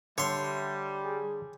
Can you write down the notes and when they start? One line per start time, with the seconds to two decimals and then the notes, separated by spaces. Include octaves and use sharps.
0.18 D3 G3 C#5 E5 C6
1.04 G#4